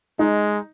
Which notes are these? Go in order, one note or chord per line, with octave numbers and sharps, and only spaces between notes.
G#3 D#4